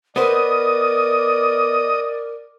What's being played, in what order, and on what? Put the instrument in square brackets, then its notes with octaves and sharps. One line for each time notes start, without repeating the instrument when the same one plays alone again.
[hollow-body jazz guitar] B3 C5 [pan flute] A#4 [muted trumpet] D5 [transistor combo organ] D#5 D#6